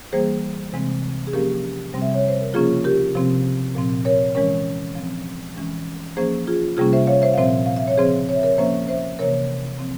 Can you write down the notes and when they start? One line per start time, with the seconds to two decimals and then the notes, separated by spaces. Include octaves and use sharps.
0.13 E3 G3 A#3 G#4 C5
0.73 C3 E3 G#3 C4
1.27 G#4
1.33 F3 A#3 C#4 G4 A#4
1.94 C3 G3 C4
2.02 E5
2.14 C#5
2.28 C5
2.41 A#4
2.54 C#3 F3 A#3 C#4 F4 G#4
2.84 G4 A#4
3.15 C3 F3 C4
3.75 A#2 F3 C4
4.05 A#4 C#5
4.35 E3 G#3 C#4 A#4 C#5
4.96 F3 C4
5.56 E3 G#3 C#4
6.17 F3 A#3 C#4 G#4 C5
6.47 F4 G#4
6.77 C3 G3 A#3 C#4 F4 G#4
6.93 C5 E5
7.07 C#5 F5
7.22 C5 E5
7.34 F5
7.38 A#2 F3 C4 C5 E5
7.66 F5
7.76 E5
7.88 C#5
7.98 C#3 F3 C4 G#4 C5
8.29 C#5
8.35 E5
8.43 A#4 C#5
8.58 F3 A#3 C#4 C5 E5
8.89 C5 E5
9.19 C3 E3 A#3 A#4 C#5
9.79 F3 C4